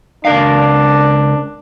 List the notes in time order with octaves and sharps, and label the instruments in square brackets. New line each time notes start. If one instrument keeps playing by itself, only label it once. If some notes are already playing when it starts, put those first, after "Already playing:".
[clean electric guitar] C#2 A#4 F5 [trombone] D4